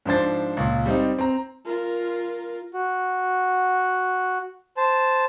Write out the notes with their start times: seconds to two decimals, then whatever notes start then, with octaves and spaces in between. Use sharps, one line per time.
0.05 G#2 F3 D4 C5 A6
0.57 C#2 A#2
0.86 G3 C4 D#4
1.19 C4 A#5
1.65 F4 A#4
2.74 F#4
4.77 C5 A5